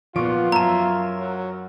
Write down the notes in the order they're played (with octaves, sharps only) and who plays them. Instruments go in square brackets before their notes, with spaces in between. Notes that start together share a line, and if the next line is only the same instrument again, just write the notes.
[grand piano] A#2 C#6 D7 [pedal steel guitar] F3 B3 [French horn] F4
[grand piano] F#2 [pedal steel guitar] A#4 C#5 E5 [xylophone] A5 A#5
[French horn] F#3